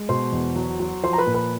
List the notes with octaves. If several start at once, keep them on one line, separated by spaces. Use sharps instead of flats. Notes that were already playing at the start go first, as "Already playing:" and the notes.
Already playing: G#3
B2 C5 C6
E2
F#3
F#3
F3 C5 C6
A#5
B4 B5
A#2
B4 B5